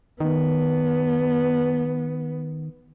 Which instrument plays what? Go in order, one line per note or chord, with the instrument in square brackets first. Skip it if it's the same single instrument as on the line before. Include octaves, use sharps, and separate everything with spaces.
[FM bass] D#3 [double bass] B3